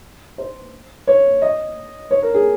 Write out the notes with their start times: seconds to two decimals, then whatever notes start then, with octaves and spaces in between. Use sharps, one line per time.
0.38 C5
1.07 C#5
1.42 D#5
2.11 C#5
2.22 A#4
2.34 G#4